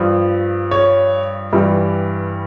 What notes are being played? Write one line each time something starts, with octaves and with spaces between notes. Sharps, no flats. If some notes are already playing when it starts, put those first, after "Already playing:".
Already playing: G2 F3
C#5
G2 E3 G3